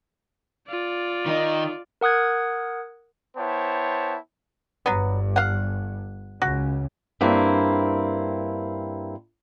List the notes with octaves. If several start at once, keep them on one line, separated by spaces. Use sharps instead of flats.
F4 D5
D#3 D#4
A#4 F#5 D#6 F#6 G#6
B3 E4 C5 C#5 G5 A5
G1 G2 F#3 B3
F5 F#5
C#2 C#3 F#4
G2 A#3 C4 E4